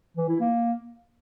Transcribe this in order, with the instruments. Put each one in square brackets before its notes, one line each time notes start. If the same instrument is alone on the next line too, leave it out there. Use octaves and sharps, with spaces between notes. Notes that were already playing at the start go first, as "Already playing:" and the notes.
[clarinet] E3
E4
A#3